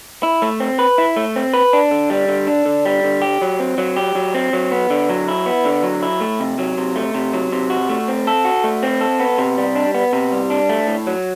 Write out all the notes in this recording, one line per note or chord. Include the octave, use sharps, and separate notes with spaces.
E4
A3
C4
B4
E4
A3
C4
B4
D4
D3
G3
D3
D4
D3
G3
D3
G4
F#3
C4
F#3
G4
F#3
C4
F#3
B3
D3
F#3
E4
B3
D3
F#3
E4
A3
C3
F#3
C3
A3
C3
F#3
C3
F#4
A3
C4
A4
F#4
A3
C4
A4
B3
C3
G3
D4
B3
C3
G3
D4
A3
A2
F#3